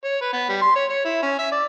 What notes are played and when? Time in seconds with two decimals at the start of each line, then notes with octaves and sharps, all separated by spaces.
0.04 C#5
0.21 B4
0.33 B3
0.49 G3
0.61 C6
0.75 C#5
0.90 C#5
1.05 E4
1.23 C#4
1.39 E5
1.52 D5